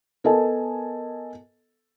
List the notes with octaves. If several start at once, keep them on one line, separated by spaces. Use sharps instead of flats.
B3 A4 A#4 D#5 G#5 A5